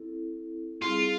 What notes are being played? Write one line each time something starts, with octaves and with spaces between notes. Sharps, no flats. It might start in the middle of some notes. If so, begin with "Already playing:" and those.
Already playing: C4 E4 A4
G3 C4 E4 F4 G#4